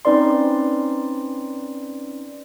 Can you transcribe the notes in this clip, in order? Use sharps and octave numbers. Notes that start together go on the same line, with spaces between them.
C4 C#4 D#4 B4 D5 C6